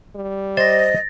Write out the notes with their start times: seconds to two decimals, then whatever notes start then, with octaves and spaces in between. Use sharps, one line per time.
0.16 G3
0.57 C5 D#5 A6 A#6